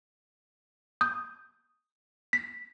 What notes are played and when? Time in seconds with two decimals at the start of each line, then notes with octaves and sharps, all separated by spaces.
1.01 D#6 G6
2.33 B6